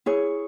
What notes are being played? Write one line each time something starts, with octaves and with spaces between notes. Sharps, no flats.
E4 G#4 C#5